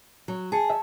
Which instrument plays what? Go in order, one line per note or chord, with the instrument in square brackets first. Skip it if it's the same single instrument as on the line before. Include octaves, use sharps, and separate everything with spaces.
[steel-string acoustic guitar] F#3
[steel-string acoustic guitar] G#4 [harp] G#5 A5 C#7
[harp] E5